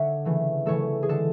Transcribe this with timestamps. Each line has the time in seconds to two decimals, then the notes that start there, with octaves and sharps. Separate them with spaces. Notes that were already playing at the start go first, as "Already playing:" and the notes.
Already playing: D3 C#5 E5 F#5
0.25 C#3 E3 A3
0.66 C#3 E3 A3 A4 C#5
1.03 G#4
1.09 D3 G#3 A4